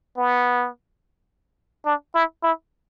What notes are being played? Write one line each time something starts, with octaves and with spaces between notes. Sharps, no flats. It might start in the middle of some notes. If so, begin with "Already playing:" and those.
B3
D4
E4
E4